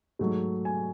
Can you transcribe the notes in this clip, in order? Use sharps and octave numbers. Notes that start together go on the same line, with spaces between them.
G#2 F#3 A3
G#5